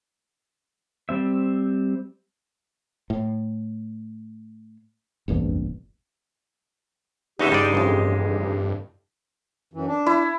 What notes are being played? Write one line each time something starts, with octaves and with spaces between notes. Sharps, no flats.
G3 C4 E5
A2
F1 A#1 E2 G2
E2 C#3 G#3 D#4 F#4 G4 E5
G2 G3 D5
A1 F2
G4
F#2 E3
D4
E4